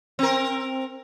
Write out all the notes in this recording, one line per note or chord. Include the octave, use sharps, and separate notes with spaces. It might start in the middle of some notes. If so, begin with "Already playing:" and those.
C4 A#4